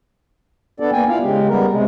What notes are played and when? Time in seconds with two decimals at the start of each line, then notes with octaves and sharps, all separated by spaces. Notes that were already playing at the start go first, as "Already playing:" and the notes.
0.80 B3 D4 A4 D5
0.92 A#3 B3 G5 G#5
1.09 E4 F4 F5
1.22 C#3 G#3 G4
1.48 G3 B3 A#4
1.71 C3 G#3